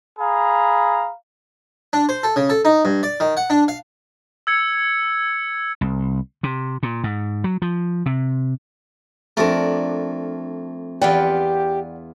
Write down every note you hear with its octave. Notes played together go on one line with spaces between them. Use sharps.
G#4 F5 A#5 B5
D4
C5
A4
C#3
A4
D#4
G2
D5
D#3
F#5
D4
F5
E6 G#6 C#7
C2
C3
A#2
G#2
F#3
F3
C3
F2 A3 D4 A#4
E2 F4 G4 B4 D5 F#5 G5